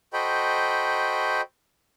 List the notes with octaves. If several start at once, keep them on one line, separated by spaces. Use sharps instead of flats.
F#4 A4 C5 D#5 G5 B5